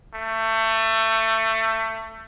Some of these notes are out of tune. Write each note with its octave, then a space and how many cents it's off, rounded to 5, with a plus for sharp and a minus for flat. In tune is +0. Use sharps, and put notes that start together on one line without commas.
A3 +20